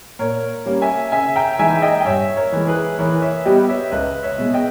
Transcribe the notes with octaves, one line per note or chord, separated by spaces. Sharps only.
A#2 A#4 C#5
G3 A#3 C#4
E5 G#5
C#3 E5 G#5
G5 A#5
E3 G#3 D#4 E5 G#5
D#5 G5
G5
G2 C#5 E5
A#4 C#5
E3 G#3
G#4 B4
E3 A#4 C#5
C#5 E5
G3 B3 G4 D#5 G5
C#5 E5
C#2 B4 D#5
C#5 E5
B2 G#3
D#5 G5